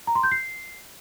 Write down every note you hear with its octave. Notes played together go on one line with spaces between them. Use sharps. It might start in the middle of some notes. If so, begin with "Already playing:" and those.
A#5
C6
G6
C7